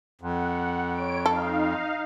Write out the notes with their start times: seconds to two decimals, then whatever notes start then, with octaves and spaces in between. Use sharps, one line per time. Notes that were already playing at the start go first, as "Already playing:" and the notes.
0.21 F2 F#5
0.94 C#5 D7
1.26 D#4 A4 F5